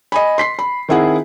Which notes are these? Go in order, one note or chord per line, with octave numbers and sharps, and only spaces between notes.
D#5 G#5 B5
C6 B6 C7
B5
D#3 C4 E4 G#4 F#5